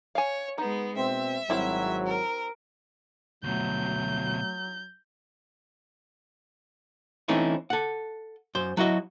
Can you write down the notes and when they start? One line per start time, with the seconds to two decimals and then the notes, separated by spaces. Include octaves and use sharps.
0.15 C#5 F5 G#5
0.58 G#3 B3 D#4
0.97 B2 C4 E5
1.50 G#1 F#3 G3 C4 E4
2.05 A#4
3.44 D2 B2 F#3 A3 G6
7.28 E3 A3 C4 C#4 D#4 E4
7.70 A4 F#5
8.55 F#2 C5
8.77 F#3 E4 F#4 D#5